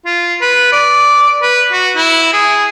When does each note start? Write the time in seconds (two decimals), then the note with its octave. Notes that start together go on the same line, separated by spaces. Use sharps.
0.06 F4
0.41 B4
0.72 D5
1.42 B4
1.72 F#4
1.96 E4
2.33 G#4